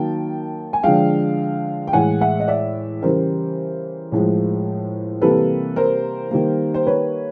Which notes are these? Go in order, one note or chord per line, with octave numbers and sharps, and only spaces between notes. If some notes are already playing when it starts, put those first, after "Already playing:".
Already playing: D#3 F#3 A#3 G5 A5
G#5
D3 F3 G#3 F5 G5
G5
A2 E3 G#3 F#5 G#5
E5 F#5
D#5
D5 E5
C#3 E3 G3 A#4 C5
A2 F3 G#3
C3 E3 G3 A#3 A4 B4
A#4 C5
D#3 G3 A#3
C5
B4 C#5